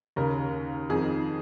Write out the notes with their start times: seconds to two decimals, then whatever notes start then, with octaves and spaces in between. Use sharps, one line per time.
0.16 D#2 C#3 A#4
0.90 F2 D#3 G#4